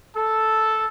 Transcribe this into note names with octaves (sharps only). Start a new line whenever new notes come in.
A4